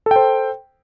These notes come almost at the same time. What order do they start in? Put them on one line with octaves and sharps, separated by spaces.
A4 G5 C5